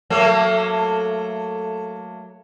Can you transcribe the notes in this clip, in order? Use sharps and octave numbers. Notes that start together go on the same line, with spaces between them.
F#3 A3 A#3